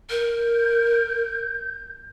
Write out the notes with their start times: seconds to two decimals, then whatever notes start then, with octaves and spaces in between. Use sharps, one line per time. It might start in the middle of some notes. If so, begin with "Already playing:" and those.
0.10 A#4 G6